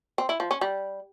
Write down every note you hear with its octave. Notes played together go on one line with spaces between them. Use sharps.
C4
E4
F3
C#4
G3